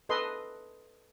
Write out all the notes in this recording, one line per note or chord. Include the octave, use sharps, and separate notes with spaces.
A4 B4 D#5 C6